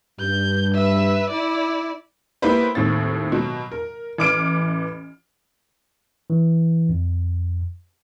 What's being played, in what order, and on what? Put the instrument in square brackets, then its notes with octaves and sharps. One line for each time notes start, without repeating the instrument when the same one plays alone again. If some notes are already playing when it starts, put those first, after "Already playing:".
[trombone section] G2 [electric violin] G6
[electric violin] B4 E5
E4 D5
[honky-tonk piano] A#3 B3 E4 G4 B4 C5
D#2 A2 C4 A6
B2 F#3
A#4
A1 E3 D6 F6 D7
[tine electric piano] E3
F2